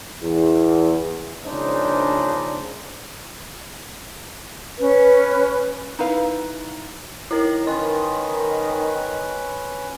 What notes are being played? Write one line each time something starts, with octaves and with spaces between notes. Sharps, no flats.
E2
A#1 C#3 G#3 D4 D#4 C5
C#4 B4
D#4 E4 B4 F5
D#4 E4 A#4 A#5
D#3 C#4 B4 C6